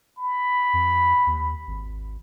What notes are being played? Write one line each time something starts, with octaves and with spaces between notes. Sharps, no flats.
B5
F2
D#2
G#1